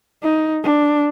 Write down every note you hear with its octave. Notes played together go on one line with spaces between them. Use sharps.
D#4
D4